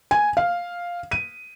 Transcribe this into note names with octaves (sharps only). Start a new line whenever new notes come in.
G#5
F5
D#7